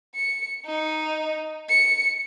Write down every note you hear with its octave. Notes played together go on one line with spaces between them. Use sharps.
C#7
D#4
C#7